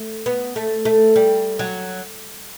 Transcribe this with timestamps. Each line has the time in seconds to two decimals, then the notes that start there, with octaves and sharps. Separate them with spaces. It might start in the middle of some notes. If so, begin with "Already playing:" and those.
Already playing: A3
0.26 B3
0.56 A3
0.85 A3
1.16 G3
1.59 F#3